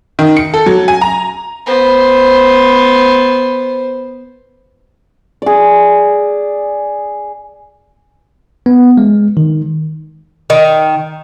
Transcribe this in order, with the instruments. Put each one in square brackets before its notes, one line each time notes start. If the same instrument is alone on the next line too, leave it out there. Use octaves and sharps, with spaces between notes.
[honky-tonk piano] D#3
C#7
A4
F#3
G#5
A#5
[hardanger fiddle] B3 C5
[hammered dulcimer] G#4 D5
[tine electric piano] B3
G#3
D#3
[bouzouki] D#3